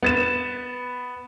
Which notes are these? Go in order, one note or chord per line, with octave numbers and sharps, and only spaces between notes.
B3 A6 E7